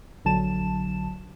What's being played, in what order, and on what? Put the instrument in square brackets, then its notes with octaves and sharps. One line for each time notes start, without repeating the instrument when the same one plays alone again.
[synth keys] A#1 D3 F#3 A5 E7